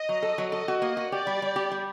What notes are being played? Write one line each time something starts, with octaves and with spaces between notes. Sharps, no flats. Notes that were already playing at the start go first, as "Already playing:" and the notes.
Already playing: D#5
F#3
A4
F#3
A4 D#5
F#4
A#3 D#5
F#4
G4 D5
G3
G3
G4
G3